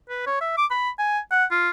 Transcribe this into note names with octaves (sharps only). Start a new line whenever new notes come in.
B4
C#5
E5
D6
B5
G#5
F#5
F4